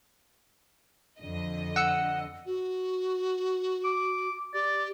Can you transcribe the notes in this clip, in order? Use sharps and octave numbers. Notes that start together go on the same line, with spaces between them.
F2 D3 D#5
F#5 E6 C#7
F#4
D6
G4 D5